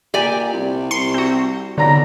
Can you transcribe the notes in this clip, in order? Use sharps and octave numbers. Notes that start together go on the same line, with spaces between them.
A#2 G4 D5 G#5
C2
C2 C6 C7 C#7
C4 F#4
B1 D3 D5 A#5 A#6